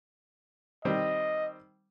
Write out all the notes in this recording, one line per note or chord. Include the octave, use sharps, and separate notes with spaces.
D#3 G3 C4 D#5